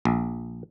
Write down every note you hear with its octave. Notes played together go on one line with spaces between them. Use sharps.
A#1